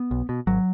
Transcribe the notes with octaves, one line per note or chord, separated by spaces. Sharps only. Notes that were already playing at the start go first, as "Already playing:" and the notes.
Already playing: B3
B1
B2
G#1 F#3